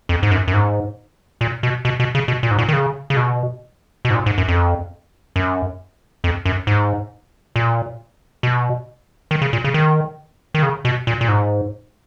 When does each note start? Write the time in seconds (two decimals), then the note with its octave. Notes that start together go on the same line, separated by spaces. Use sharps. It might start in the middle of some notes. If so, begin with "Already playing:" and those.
0.09 F2
0.23 G#2
0.31 F#2
0.47 F#2
0.54 G#2
1.41 A#2
1.63 B2
1.85 B2
2.00 B2
2.15 C#3
2.28 B2
2.43 A#2
2.51 G#2
2.59 A#2
2.68 D#3
2.73 C#3
3.10 C#3
3.17 B2
4.05 B2
4.10 G#2
4.15 A#2
4.26 G#2
4.38 F#2
4.48 F2
5.36 F#2
6.24 F2
6.45 F#2
6.67 G#2
7.56 A#2
8.43 B2
9.31 D#3
9.42 C#3
9.53 A#2
9.64 C#3
9.74 D#3
10.54 D#3
10.63 C#3
10.85 B2
11.07 A#2
11.21 A#2
11.28 G#2